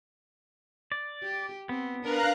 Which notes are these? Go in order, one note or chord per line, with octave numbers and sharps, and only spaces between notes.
D5
G4
B3 C4
D4 A#4 B4 F5 A#5 F#6